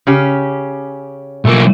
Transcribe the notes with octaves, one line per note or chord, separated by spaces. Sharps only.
C#3 C#4 G4
B1 A3 A#3